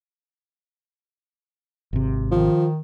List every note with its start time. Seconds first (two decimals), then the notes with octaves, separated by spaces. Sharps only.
1.93 G#1 C3
2.31 D#3 F3